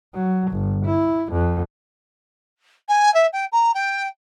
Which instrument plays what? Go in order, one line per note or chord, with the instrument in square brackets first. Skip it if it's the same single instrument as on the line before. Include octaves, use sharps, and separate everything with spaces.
[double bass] F#3
G1
E4
F2
[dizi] G#5
E5
G5
A#5
G5